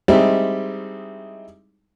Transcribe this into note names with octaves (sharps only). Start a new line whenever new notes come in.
G3 G#3 C4 D#4 E4